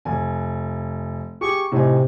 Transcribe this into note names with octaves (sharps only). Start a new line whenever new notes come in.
F1 G#5
G4 G#4 C#6 D6
A2 C3 D#4 G#5